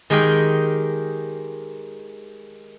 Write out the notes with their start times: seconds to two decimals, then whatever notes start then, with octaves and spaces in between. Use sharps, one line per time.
0.10 D#3 G#3 D#4 G4 A#4 G5